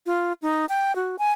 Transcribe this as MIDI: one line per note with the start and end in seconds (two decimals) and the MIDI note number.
0.06 0.33 65
0.42 0.65 63
0.69 0.95 79
0.95 1.16 66
1.19 1.32 80